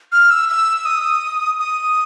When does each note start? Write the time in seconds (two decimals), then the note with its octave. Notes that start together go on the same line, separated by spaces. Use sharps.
0.12 F6
0.31 E6
0.49 E6
0.85 D#6
1.60 D#6